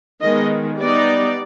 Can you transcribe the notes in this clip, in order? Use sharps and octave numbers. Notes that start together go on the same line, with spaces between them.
D#3 G#3 B3 D#5
G3 B3 D#4 D5